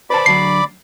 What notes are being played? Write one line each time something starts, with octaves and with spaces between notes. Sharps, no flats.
B4 C5 D5 A5 B5 D6
D2 F#3 C7